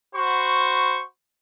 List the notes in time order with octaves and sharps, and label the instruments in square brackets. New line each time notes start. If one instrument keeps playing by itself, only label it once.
[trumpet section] F#4 C5 B5 C#6